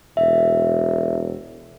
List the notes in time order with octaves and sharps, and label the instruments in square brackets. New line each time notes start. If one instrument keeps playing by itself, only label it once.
[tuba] E1 [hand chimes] E5